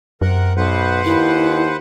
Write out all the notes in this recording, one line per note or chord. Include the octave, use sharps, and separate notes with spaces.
F#2 C3 A#4 F#5
B1 B4 C5 F#5
D#2 E4